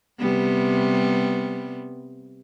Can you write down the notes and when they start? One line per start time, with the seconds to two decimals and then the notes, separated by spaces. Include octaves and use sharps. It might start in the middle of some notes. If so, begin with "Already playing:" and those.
0.19 C3 G3 B3